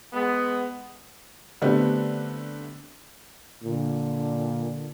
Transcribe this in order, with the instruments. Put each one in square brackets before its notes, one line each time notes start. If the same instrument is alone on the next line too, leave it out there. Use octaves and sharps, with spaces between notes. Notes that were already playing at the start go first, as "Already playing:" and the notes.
[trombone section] G#3 B3
[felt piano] D3 G3 A3 B3 C4
[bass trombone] A#2 [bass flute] D3